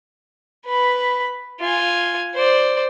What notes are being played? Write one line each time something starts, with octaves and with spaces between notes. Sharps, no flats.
B4 B5
F4 G#5
C5 D5